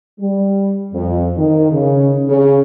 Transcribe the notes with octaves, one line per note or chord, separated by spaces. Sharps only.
G3
F2
D#3
C#3
C#3